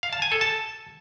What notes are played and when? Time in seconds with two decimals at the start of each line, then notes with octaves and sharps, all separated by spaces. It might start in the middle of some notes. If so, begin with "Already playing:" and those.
0.03 F5
0.13 A5
0.22 G#5
0.32 A4
0.41 A5